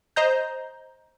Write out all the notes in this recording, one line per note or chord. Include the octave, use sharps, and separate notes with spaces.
C5 D#5 A#5 G6